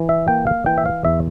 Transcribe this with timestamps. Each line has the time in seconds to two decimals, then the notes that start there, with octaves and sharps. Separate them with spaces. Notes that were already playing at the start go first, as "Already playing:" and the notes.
Already playing: E3
0.09 E5
0.28 A#3 G5
0.47 F5
0.66 E3 G5
0.78 E5
0.86 F5
1.05 E2 E5